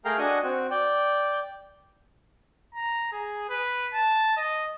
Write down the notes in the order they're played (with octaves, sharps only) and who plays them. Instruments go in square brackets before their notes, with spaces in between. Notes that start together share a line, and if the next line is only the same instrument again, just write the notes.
[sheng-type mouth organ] A3 G#4 A#4 F5 G5 A#5
D4 F#4 D#5 F#5 G#5
C4 F#4
D5 G5
[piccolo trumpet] A#5
G#4
B4
A5
D#5